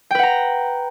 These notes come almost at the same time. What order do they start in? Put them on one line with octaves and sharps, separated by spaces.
G5 B4 F#5 A#5